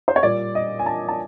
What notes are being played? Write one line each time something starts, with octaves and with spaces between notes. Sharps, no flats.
C5
C#5
A#2 G3 D5
D#5
G#5
A5
A5